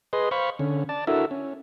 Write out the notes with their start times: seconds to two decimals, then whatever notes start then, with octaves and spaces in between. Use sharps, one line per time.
0.13 G#4 B4 D#5 C6
0.31 C5 F5 B5 C#6
0.59 D3 C#4
0.89 D5 A5
1.07 D4 E4 F#4 A4 A#4 E5
1.31 C#4